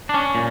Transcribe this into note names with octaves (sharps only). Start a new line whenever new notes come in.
D4
C#4
A#2